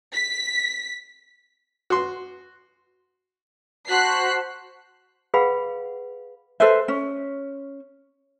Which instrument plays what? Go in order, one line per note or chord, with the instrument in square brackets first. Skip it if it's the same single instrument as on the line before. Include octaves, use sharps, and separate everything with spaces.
[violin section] B6
[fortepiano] F#4 C6
[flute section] F#4 C5 A5 [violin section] F#6 B6 C7
[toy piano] G#4 B4 F5 F#5 B5
[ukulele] A4 B4 C5 E5
C#4